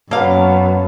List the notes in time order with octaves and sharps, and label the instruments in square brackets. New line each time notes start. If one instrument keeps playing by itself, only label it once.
[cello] F#2 [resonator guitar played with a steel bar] A#3 F5 [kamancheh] B3 C#4 [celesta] C#5 A5